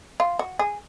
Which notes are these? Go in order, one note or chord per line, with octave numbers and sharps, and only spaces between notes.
F4
F#4
G#4